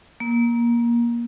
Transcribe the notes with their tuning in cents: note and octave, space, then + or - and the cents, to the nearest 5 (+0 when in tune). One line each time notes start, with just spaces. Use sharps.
A#3 +20